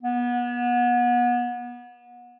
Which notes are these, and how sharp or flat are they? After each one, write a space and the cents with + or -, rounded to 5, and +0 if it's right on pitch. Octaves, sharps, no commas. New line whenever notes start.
B3 -30